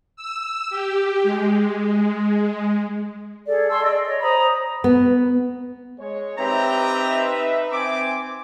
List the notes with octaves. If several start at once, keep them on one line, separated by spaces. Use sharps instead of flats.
E6
G4
G#3
G#4 A4 D5
A5 C6 C#6 E6
G#4 D5 D#5 E6
C#5 D#5
C5 A#5 B5 D#6
B3
G#3 C#5
C4 D#4 G4 B4 E5 A#5
C4 G#5 D6